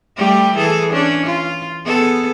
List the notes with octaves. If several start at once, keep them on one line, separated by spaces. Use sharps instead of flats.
G3 A3 G4
E3 G#4 A4
C#4 D4
F4
B3 G#4 A4